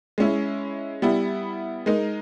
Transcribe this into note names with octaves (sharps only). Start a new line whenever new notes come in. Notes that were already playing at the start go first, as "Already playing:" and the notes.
G#3 C#4 E4
G3 B3 E4
G#3 D#4 A#4